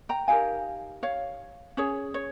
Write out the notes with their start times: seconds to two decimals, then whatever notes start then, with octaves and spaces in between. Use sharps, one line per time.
0.09 G5 A#5
0.28 D#4 G4 A#4 F5 G#5
1.03 C#5 F5
1.77 C#4 G#4 C#5
2.14 C#5